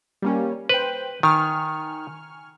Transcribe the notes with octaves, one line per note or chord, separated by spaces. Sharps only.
G3 A#3 C#4
B4 C5 G5
D#3 G#5 C#6 F6